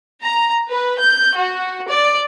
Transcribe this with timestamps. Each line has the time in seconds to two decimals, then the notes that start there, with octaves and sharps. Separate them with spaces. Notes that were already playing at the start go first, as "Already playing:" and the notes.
0.22 A#5
0.70 B4
0.99 G6
1.38 F#4
1.88 D5